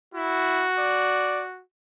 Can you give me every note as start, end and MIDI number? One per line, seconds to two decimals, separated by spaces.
0.14 0.67 64
0.14 1.62 66
0.78 1.42 74